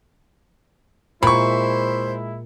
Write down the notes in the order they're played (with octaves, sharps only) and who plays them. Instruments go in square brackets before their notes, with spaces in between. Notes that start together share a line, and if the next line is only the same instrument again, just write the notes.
[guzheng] A#2 [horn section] G#3 E4 [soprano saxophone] C5 [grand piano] B5 C#6